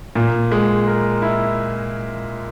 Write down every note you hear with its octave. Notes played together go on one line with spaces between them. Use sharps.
A#2
G#3
A#4
E4